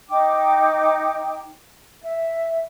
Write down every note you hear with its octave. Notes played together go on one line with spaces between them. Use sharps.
D#4 G5 D6
E5